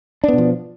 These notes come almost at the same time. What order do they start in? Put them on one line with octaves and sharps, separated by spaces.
D4 B3 B2 F3